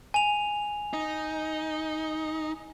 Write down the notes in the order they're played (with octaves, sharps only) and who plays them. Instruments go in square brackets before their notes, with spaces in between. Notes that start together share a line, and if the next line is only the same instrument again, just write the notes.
[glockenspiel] G#5 F7
[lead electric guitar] D#4